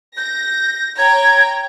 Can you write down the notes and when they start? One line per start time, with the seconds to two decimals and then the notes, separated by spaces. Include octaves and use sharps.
0.17 G6 A#6
0.98 C#5 G5 A#5 G#6